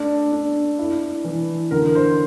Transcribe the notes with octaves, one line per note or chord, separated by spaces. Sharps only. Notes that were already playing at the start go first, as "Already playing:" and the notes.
Already playing: A3 D4
D4
E4
E3
D3 A#4
C5